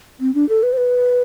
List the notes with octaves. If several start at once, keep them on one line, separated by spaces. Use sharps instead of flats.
C4
D4
A4
B4
C5
B4